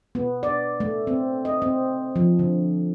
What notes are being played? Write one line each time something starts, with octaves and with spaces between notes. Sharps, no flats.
B3
D5
A3
C4
D#5
C4
F3
D3